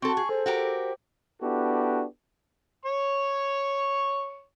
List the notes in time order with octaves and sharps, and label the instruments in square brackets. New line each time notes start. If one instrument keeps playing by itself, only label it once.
[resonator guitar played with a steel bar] C4 A4 [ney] F#4 [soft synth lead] C#6
[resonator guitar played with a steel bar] G#4
[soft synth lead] A4 [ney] C5
[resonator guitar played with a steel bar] F#4 G4 A#4
[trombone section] B3 D4 E4 F#4 G4 A4
[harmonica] C#5 C#6